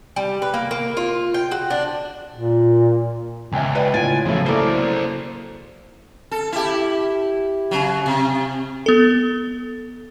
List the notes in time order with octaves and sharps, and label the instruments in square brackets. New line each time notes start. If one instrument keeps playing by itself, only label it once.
[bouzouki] G3
B4
A#3
A#3
F4
G5
F#4
D4
[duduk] A#2
[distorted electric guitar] C#2 [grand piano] E5 G5 G#5
[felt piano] B4 D5 D#5
[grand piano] A2 F4 D7 [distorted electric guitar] G#5 [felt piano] A6
[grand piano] C#3 F#3 A3 [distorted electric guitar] F3 E4
[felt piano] A#3 E4 A4 [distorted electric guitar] C5 D5
[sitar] A4
E4 G4
C#3 F#3
C3
[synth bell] B3 A4